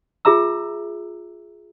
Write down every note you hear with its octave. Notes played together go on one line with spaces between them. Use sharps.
F4 G#4 E5 A#5 E6